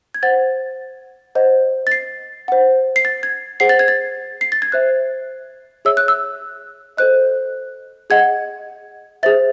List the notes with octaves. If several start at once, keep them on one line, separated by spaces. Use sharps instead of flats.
G#6
C5 F#5 A6
C5 D#5 F#5
A6
C7
C5 F#5
C7
A6
G#6
G#4 C5 F#5 C7
A6
G#6
A6
C7
A6
G#6
C5 E5 F#6
G#4 C#5 E5 E6
F#6
E6
A4 C5 D#5 F#6
G#4 D#5 F#5 G#6
G#4 C5 E5 A6